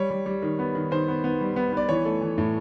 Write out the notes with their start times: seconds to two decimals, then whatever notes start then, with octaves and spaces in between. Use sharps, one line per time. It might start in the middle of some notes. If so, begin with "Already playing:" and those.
Already playing: G3 C#5
0.10 G3
0.26 G3
0.42 D#3
0.59 B3
0.75 D#3
0.91 D#3 C5
1.08 B3
1.24 B3
1.41 G3
1.56 B3
1.73 B3 D5
1.89 E3 C#5
2.05 A3
2.22 E3
2.38 A2